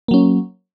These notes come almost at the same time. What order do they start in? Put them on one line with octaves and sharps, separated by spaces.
A#3 F#3 C#4